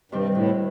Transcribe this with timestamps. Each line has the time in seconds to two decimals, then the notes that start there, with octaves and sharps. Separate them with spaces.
0.12 G2 C3 D#3 G3 C4
0.34 D2 A2